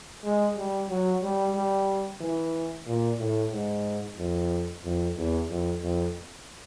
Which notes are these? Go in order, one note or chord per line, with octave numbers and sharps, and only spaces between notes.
G#3
G3
F#3
G3
G3
E3
A#2
A2
G#2
F2
F2
E2
F2
F2